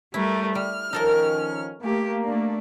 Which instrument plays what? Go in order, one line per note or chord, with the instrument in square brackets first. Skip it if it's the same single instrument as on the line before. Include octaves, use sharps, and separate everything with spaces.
[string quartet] G3 A3 A#4 [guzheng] E4
[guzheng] G3 [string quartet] F6
[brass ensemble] D#3 F3 C#4 [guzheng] D#4 A4 A#4
[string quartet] A3 G4 [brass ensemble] A#3
[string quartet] A3 D4